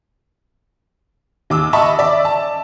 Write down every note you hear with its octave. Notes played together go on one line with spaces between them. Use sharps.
D#2 D6 E6
D#5 E5 A5 B5 C#6
D5 E5
A5